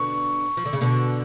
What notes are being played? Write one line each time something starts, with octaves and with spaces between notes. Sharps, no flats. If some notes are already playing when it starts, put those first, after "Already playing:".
Already playing: B2 D3 C#6
F3
D3
C#3
B2 D3